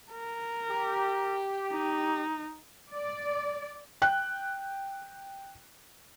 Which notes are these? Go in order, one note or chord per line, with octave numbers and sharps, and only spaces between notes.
A#4
G4
D#4
D5
G5 F#6